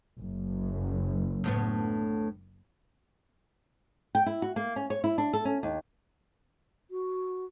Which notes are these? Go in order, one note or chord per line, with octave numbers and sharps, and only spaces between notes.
F#1 F#2
D2 A2 B3
G5
E4
F#4
A#3
C#4
C#5
E4
D4
A4
C#4
D#2
F#4